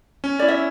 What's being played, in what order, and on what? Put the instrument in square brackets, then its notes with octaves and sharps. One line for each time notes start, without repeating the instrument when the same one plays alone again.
[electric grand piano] C#4
[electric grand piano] E4 [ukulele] D5
[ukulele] E5